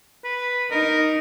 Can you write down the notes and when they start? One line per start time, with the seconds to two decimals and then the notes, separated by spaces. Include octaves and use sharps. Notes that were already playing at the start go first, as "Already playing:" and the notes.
0.25 B4
0.71 D#4 A#4